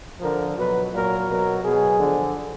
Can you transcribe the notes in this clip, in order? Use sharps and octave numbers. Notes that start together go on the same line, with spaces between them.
D3 F3 A#4
B2 F#3 B4
A#2 F#3 A#4
B2 F#3 A#4
B2 F#3 G#4
D3 F3